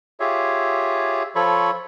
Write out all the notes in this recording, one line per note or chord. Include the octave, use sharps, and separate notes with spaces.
F4 G4 G#4 C#5 E5
F3 F4 A4 C#5 B5 C#6